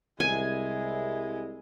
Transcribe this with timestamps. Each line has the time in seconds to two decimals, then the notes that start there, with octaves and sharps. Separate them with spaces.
0.20 C2 G#3 E4 G#5